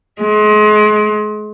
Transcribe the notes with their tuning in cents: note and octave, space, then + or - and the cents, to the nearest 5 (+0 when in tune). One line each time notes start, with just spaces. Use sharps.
G#3 +30